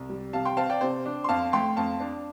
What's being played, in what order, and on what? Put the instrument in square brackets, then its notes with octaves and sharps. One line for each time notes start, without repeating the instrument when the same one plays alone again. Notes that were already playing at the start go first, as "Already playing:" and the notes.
Already playing: [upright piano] C2
G3
C3 F5 A5
G5 C6
C4 F5 A5
D5 G5
C3 C5
D4
C6
F2 F5 A5
A3 G5 C6
F2 F5 A5
D4